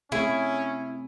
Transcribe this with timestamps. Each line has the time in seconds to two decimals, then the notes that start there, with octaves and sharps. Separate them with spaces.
0.12 C3 A3 C#4 E4 G#4